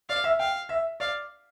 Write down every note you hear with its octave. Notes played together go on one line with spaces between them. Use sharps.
D5 F5
E5
F5 G5
E5
D5 F5